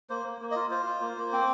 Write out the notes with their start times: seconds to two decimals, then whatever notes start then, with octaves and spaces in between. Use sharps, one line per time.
0.10 A#3 C5
0.26 A#3
0.41 A#3
0.51 F4 D#5
0.71 F4 C5
0.86 F4
1.01 A#3
1.17 A#3
1.33 C4